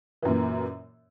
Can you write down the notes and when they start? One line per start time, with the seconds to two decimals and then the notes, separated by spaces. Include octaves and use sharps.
0.22 E3
0.25 F#2
0.28 A#2